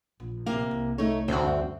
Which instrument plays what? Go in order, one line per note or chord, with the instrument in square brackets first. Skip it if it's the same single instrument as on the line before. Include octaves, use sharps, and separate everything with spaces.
[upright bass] A#1
[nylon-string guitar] C3 A#3 F5
[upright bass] C2
[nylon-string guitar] A3 D#4 C#5
[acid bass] D2 [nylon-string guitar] C4 F#4
[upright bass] G2 D4